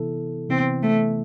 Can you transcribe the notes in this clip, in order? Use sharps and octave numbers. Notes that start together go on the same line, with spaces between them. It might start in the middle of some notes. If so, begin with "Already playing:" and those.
Already playing: C3 E3 B3 E4 A4
C3 E3 B3 C4 E4
A3